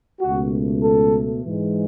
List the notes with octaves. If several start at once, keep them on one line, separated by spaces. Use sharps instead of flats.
C#2 B2 A3 F#4
A4
G#2 E3 G#3